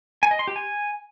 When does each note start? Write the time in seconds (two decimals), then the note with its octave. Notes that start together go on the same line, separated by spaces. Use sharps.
0.23 G#5
0.31 D#5
0.39 C6
0.47 G4
0.56 G#5